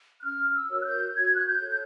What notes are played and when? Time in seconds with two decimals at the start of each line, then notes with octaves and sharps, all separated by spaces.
0.20 F#6
0.24 C#4 F6
0.55 E6
0.70 F#4 A#4 C#5
0.81 F#6
0.85 G6
1.15 F#4 G#6
1.35 F#6
1.46 G6
1.62 A4 C#5
1.71 G6